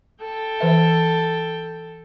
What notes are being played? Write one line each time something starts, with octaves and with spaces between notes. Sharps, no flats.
A4 G5
E3 B4 E5